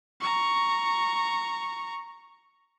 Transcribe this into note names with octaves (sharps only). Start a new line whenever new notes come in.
A#5 C#6